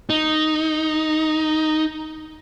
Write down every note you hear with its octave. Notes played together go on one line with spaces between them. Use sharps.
D#4